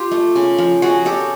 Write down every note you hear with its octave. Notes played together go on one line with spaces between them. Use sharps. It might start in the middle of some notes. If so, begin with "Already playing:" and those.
Already playing: F4 G4
A3
C#3
F3
C#3 F#4 G#4
C#3 G4 A4